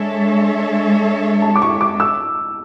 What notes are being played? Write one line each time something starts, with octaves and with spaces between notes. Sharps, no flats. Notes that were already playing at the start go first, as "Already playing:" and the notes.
Already playing: G#3 D4 A4 C#5 E5
A5
D6
C#6
D6
E6